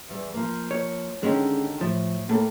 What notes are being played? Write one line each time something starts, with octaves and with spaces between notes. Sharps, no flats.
E2 G3
F3 A#3
C#5
D3 D#3 G#3 C#4 G4
A2 F3
A2 A#3 A4